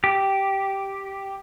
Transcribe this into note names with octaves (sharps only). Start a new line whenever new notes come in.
G4